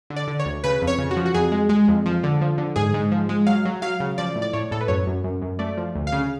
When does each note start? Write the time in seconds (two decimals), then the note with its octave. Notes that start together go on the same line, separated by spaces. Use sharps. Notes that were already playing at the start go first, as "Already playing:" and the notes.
0.10 D3
0.16 D5
0.28 D3
0.40 C#5
0.45 D2
0.64 C#3 B4
0.82 F2
0.87 C#5
0.99 C#3
1.11 F#4
1.17 F3
1.26 F#4
1.34 F2 G#4
1.52 G#3
1.69 G#3
1.88 F2
2.06 F3
2.23 D3
2.41 F3
2.58 D3
2.76 G#2 G#4
2.94 G#2
3.12 F3
3.29 G#3
3.47 F#3 F5
3.65 F#3
3.82 F#3 F5
4.00 C#3
4.18 F3 D5
4.36 A2
4.42 D5
4.53 A2 C#5
4.71 A2 A4
4.81 B4
4.88 F#2 C#5
5.07 F#2
5.24 F#2
5.42 F#2
5.59 A3 D5
5.77 F3
5.95 D2
6.07 F5
6.12 C#3